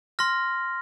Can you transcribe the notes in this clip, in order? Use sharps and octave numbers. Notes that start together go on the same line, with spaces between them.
C6 F6 A#6